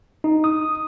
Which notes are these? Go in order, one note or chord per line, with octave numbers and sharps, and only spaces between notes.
D#4
D#6